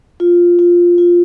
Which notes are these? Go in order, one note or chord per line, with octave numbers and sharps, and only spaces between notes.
F4
F4
F4